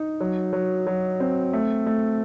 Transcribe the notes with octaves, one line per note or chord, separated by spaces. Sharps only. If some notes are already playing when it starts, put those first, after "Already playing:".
Already playing: D#4
F#3
F#3
F#3
C4
A3
A3